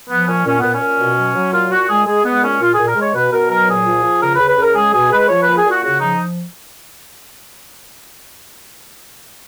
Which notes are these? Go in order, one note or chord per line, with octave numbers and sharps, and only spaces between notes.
F3 B3
A#2 C#4
A#2 C#4
A#2 B3
C#4
A#2
B2
F#3
F#3
A#2 F4
A#2 F#4
G#3 G#4
G#3 G#4
G#3 B3
A#2 C#4
A#2 F4
A#2 G#4
A#4
G#3 C#5
B2 B4
B2 A#4
F#3 A#4
A#2 G#4
F3
F3
C#3 A#4
B4
C#3
B4
C#3 A#4
G#3 G#4
B2 G#4
G#3 B4
F3 C#5
B4
A#2
G#4
A#2
F#4
C#3 F#4
F3 D#4